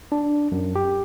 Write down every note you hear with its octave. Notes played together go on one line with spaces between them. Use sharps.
D4
F#2
G4